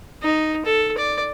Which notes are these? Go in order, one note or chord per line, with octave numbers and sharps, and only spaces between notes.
D#4
A4
D5